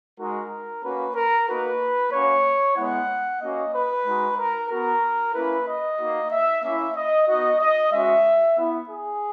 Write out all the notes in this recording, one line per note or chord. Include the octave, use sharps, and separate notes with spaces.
G#3 D#4 F#4 A#4
A#3 C#4 F#4 B4
A#4
A#3 D#4 F#4 B4
A#3 C#4 F#4 C#5
G#3 B3 E4 F#5
A#3 C#4 F#4 D#5
B4
G#3 D#4 F#4
A#4
B3 F#4 A#4
A#3 C#4 E4 B4
D#5
A#3 D#4 F#4
E5
A#3 C#4 E4 E5
D#5
B3 D#4 F#4 D#5
D#5
G#3 C#4 F#4 E5
B3 E4
G#4